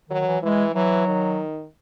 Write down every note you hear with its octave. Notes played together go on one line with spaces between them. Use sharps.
D#3 F#3
E3
E3 G#3
E3 F#3
D#3